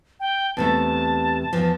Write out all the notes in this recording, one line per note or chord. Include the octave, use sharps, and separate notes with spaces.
G5
E2 C3 A3 A5
E2 F3